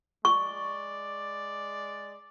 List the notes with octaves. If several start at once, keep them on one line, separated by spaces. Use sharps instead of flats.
G#3 D5 C#6